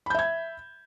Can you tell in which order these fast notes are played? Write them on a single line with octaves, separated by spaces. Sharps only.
B5 G6 E5 G#6